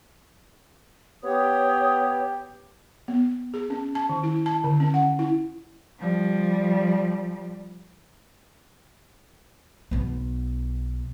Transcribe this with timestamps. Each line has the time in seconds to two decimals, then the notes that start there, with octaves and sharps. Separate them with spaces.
1.24 B3 G4 C#5 D#6
3.08 B3
3.54 G#4
3.70 C#4
3.95 A5
4.09 D#3
4.23 E4
4.46 A5
4.64 D3
4.80 C#4
4.94 F#5
5.19 E4
5.99 F3 G3
9.91 B1 B3